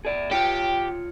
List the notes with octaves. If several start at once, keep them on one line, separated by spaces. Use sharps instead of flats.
G#4 D5
F4 G4 C#5